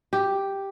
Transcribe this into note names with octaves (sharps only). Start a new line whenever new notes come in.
G4